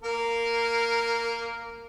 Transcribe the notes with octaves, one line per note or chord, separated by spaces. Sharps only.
A#3 A#4